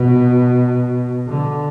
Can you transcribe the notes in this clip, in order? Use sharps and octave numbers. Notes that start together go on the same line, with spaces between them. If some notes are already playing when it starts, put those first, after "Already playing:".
Already playing: B2
D3